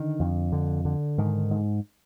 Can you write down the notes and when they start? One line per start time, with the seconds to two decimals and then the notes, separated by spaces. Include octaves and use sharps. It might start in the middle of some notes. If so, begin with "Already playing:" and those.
Already playing: D3 D#3
0.20 F2
0.52 D3
0.85 D3
1.18 G#2 D#3
1.51 G#2